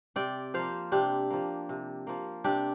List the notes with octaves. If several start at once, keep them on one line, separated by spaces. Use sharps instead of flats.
C3 D5 G5
F3 A#3 C5 F5
C3 D4 G4
F3 A#3
C3
F3 A#3
C3 D4 G4